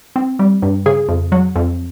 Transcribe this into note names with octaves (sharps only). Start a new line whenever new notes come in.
C4
G3
G2
C#3 G#4
F2
F#3
F2